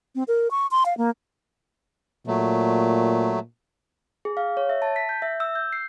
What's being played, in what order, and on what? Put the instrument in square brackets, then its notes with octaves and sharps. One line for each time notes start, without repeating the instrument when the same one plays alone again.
[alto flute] C4
A#4
C#6
C6
F5
A#3
[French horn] A#2 [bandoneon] F#3 A3
[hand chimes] G#4
F5
C#5
E5
A5
B6
G6
E5
E6
G6
C7